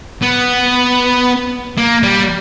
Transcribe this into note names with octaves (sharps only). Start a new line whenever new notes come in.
B3
A#3
G3